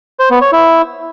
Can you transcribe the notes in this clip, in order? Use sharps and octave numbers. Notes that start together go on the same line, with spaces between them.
C5
B3
C#5
E4